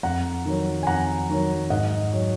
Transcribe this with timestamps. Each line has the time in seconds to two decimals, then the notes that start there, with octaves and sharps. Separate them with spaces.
0.03 F2 F#5 A#5
0.45 D#3 F#3
0.83 G#5
0.87 F2 F#5 A#5
1.29 D#3 F#3
1.70 G#2 D#5 F#5
2.13 F#3